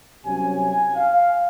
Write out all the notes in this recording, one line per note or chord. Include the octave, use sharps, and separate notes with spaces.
C2 C3 F#3 C#4 G#5
G#5
F5